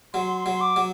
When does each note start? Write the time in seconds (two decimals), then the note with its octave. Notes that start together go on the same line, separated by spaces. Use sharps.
0.14 F#3 C6
0.37 C6
0.46 F#3
0.61 D6
0.76 F#3